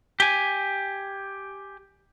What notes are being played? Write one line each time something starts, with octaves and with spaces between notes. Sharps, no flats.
G4 G#5